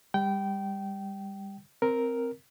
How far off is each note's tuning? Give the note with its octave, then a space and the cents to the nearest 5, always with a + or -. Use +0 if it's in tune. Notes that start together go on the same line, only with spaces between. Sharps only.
G3 +25 G5 -20
C4 +0 A#4 +0